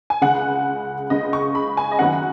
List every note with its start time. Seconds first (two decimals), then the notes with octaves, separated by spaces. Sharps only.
0.10 G#5
0.21 C#2 C#3 G#3 F#5
1.10 C#2 C#3 G#3 D#5
1.33 C#6
1.55 B5
1.77 G#5
1.91 D#5
1.99 F#2 D#3 F#3 B3 F#5